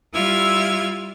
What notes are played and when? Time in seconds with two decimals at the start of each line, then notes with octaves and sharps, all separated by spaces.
0.14 G3 E4 F4 E6 F6 G#6